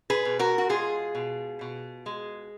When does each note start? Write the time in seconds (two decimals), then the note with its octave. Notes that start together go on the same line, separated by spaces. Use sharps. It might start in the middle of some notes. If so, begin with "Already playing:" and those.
0.10 G#4 B4
0.25 B2
0.39 F#4 A#4
0.58 F#4
0.69 G#3 F4 G#4
1.15 B2
1.61 B2
2.06 G#3